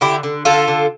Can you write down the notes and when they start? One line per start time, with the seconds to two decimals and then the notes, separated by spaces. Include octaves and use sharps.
0.01 D3 E4 G4
0.23 D3
0.45 D3 F4 A4
0.68 D3